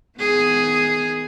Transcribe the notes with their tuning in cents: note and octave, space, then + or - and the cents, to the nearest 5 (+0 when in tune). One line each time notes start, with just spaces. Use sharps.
D#3 +25 B3 +25 G#4 +0